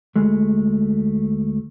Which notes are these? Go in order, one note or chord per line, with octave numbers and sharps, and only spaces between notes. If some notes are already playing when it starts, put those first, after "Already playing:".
D2 G#3 A3